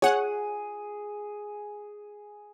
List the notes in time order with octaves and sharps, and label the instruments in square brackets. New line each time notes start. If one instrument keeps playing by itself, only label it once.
[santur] G#4 [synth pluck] C#5 F#5